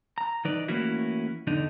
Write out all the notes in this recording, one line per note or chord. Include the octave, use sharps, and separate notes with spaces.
A#5
E3 D#4 B4 D5
E3 A3 A#3 C#4 E4 F#4
E2 D3 D4 D#4